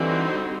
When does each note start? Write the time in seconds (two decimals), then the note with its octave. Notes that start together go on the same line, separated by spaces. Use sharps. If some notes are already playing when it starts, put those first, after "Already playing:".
Already playing: D3 E3 G3 C4 D#4 F#4